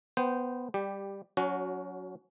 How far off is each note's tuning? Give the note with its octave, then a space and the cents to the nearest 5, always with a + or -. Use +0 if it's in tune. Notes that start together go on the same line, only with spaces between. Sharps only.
B3 +0 C5 -10 G5 -15
G3 +10 G4 +0
F#3 -10 C#4 +25 F#4 +0